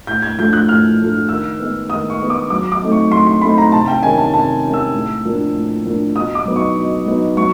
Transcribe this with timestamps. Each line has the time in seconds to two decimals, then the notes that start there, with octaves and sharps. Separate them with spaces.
0.07 A2 G6
0.22 G#6
0.39 F3 A3 D4 G6
0.53 F#6
0.69 A2 F6
0.98 F3 A3 D4
1.29 D#3 E6
1.60 G#3 B3
1.90 D#3 D#6
2.10 C#6
2.20 G#3 B3
2.30 D6
2.50 F#3 D6
2.72 D6
2.82 A3 C4 D#4
2.92 C#6
3.11 F#3 C6
3.27 C6
3.41 A3 C4 D#4 B5
3.58 A#5
3.72 C3 A5
3.88 G5
4.02 D#3 G#3 C#4 G#5
4.18 A5
4.33 C3 A5
4.64 D#3 G#3 C#4
4.74 E6
4.94 A2
5.25 F3 A#3 D4
5.55 A2
5.85 F3 A#3 D4
6.16 B2 D#6
6.35 D6
6.45 F#3 B3 D#4
6.56 C#6
6.77 B2
7.06 F#3 B3 D#4
7.37 F#3 C#6